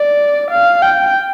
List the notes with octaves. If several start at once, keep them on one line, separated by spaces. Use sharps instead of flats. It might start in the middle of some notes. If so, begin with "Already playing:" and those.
Already playing: D5
F5
G5